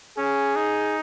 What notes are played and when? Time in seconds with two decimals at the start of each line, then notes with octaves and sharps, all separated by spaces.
0.18 C#4 G#4
0.56 D#4